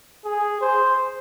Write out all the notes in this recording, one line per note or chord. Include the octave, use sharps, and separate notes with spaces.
G#4
C5